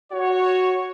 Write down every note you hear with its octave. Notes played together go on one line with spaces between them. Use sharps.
F#4 C#5